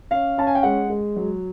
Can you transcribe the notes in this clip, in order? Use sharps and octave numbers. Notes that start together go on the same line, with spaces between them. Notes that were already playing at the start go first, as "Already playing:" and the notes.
C#4 F5
C#4 A5
G#5
G5
G#3 F#5
G#3
F#3